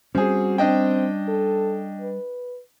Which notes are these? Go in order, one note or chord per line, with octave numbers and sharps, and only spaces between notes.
G3 C4 C#4 F#4 G#4
C4 D4 D#5 G5
A4
B4